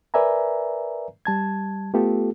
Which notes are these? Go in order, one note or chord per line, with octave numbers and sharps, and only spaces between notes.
A#4 B4 D5 E5 G#5 A#5
G3 A5 G#6
A3 B3 F4 G4 A4